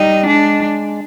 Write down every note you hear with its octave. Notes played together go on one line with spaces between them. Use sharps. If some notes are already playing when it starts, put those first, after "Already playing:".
Already playing: G3 D#4
G#3 D4